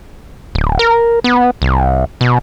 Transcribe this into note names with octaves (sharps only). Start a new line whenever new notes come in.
D1
A#4
B3
C2
B2